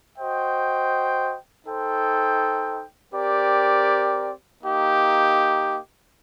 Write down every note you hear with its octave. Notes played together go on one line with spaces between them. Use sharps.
F#4 C5 D#5 G5
D#4 A4 C5 G5
C4 G4 A#4 D5
A#3 D#4 G4